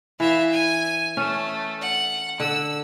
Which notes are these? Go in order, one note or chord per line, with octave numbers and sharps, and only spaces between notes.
E3 E5 F5
G#5
A3 C#4
F#5
D3 E6